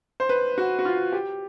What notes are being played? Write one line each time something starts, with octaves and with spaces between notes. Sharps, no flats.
C5
B4
F#4
F#4
F4
G4